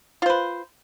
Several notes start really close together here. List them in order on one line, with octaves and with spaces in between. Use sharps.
F4 C5 B4